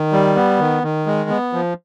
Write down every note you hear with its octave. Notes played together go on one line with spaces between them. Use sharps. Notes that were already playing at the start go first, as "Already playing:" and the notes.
Already playing: D#3
G3
B3
D#3
D#3
G#3
B3
F3